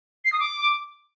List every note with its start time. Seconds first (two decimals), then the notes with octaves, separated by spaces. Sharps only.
0.25 C7
0.32 D#6
0.40 D6